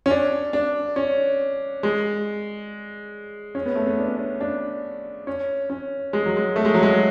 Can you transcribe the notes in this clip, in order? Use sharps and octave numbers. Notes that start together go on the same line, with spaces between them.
C#4
D4
D4
C#4
G#3
C#4
B3
A3
B3
D4
C#4
D4
D4
C#4
C#4
G#3
F#3
G#3
A3
G#3
F#3
G#3